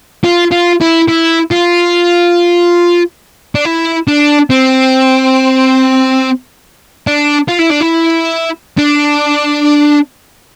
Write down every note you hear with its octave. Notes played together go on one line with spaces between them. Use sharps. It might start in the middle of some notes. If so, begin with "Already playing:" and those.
F4
F4
E4
E4
F4
D4
E4
D4
C4
D4
F4
E4
D4
E4
D4